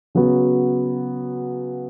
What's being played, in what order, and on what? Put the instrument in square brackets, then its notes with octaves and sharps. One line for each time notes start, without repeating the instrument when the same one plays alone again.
[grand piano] C#3 F#3 B3 F#4